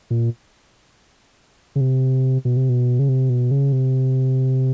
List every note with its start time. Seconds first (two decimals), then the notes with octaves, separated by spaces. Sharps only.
0.10 A#2
1.76 C#3
1.81 C3
2.45 B2
2.57 C3
2.69 B2
2.99 C#3
3.09 C3
3.30 B2
3.51 C#3
3.72 C3